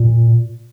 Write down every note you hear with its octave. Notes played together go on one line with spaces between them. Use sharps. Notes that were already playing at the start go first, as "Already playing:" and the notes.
Already playing: A#2